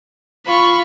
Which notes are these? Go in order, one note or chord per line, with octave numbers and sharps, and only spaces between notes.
F4 B5 C#6